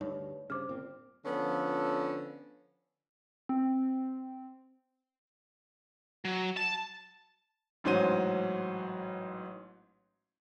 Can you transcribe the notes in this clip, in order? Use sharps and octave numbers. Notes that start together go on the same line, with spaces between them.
D2 G2 D#4 C#5
G2 C#3 C5 D6 F6
G1 A#2 C4
D3 F3 B3 C#4 A4
C4
F#3
A5
A1 G#2 F#3 C5 D#7